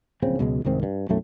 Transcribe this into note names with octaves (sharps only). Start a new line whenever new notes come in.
D1 A#1 C#3 C4
C#2 B2 F#3 G#3
C2 G#2 D#3 C4
G2
B1 F#2 A2 A3